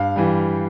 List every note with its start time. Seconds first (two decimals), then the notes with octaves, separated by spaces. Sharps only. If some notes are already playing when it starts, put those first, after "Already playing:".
Already playing: G2 F5
0.16 E3 G3